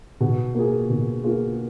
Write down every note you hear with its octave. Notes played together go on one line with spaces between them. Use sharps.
B2
A#3 F4 G#4
B2
A#3 F4 G#4